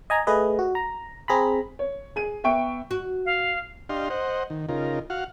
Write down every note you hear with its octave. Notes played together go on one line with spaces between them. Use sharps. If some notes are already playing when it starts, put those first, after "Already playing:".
D#5 G#5 A#5
A3 G#4 B4 D#5
F#4
A#5
C4 G#4 A#5 B5
C#5
G#4 D#7
B3 E5 G5 C#6 D7
F#4
F5
D4 G4 D#5 F5 C6
C5 D#5 F#5
D#3
C#3 D#4 F4 A#4
F#4 F5 F#5